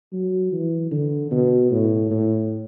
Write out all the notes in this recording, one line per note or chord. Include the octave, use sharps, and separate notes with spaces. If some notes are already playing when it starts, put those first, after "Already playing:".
F#3
E3
D3
B2
A2
A2